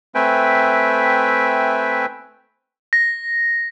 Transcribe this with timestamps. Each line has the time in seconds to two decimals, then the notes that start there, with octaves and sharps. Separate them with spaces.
0.15 A3 C4 B4 E5 G5 G#5
2.93 A#6